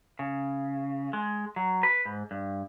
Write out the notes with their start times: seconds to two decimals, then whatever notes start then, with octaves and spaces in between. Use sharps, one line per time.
0.19 C#3
1.13 G#3
1.56 F#3
1.83 B4
2.05 G#2
2.31 G2